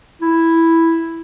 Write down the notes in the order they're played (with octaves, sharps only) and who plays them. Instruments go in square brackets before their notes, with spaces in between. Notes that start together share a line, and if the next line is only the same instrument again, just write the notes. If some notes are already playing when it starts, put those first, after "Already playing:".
[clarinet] E4